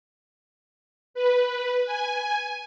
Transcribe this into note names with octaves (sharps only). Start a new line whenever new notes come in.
B4
G#5